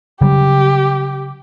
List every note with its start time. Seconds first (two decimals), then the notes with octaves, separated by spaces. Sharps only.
0.21 C#3 F#3 G3 G4